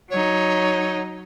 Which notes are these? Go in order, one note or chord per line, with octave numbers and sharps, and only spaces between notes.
F#3 D#4 C#5